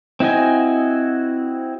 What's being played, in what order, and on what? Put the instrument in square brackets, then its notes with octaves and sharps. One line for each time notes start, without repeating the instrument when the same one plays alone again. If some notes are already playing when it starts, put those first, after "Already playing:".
[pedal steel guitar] C4 E4 F#4 D#5 G#5